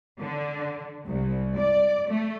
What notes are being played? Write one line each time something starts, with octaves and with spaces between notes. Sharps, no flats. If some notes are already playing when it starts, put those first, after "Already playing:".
D3
C2
D5
A3